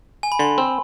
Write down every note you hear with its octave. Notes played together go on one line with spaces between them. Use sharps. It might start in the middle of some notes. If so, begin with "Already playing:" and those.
G#5
B5
D3 C6
C4